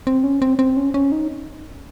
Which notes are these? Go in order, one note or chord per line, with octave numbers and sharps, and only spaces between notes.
C4
C#4
C4
C4
C#4
C#4
D#4